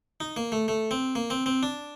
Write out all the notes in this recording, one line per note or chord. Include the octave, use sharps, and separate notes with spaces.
D#4
A#3
A3
A3
C4
A#3
C4
C4
D4